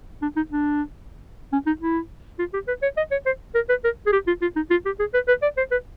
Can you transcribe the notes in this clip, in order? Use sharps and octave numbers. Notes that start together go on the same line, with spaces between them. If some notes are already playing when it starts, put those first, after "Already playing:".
D4
D#4
D4
C#4
D#4
E4
F4
G4
B4
C#5
D#5
C#5
C5
A#4
B4
A#4
G#4
G4
F4
F4
D#4
F4
G4
G#4
B4
B4
D5
C5
B4